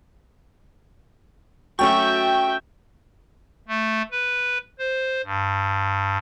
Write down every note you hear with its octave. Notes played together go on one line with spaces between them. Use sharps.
F#3 A3 C#4 F#4 E5 G5 C#6
A3
B4
C5
G2